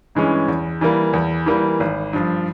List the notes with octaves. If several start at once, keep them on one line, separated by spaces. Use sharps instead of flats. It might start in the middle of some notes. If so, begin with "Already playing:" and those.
G2 E3 G#3 C#4
E2
E3 G3 A#3
E2
E3 G3 A#3
G#1
G2 F3